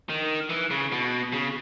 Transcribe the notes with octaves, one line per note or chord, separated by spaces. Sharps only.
D#3
E3
C#3
B2
C#3